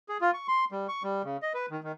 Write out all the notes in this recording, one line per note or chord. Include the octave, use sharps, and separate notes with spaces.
G#4
F4
C#6
C6
G3
C#6
G3
C#3
D#5
B4
D#3
D#3